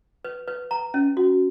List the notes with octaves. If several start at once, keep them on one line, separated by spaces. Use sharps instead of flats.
B4
B4
A#5
C#4
F#4